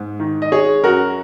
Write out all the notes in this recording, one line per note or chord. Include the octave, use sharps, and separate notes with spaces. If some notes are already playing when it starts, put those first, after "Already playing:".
Already playing: G#2
D#3
D#5
G#3 G#4 C#5
F#2 F#4 A#4